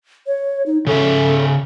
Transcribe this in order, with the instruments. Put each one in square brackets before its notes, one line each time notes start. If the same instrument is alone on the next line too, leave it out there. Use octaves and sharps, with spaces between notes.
[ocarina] C#5
D#4
[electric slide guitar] C#3 C#4 E5 [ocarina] A4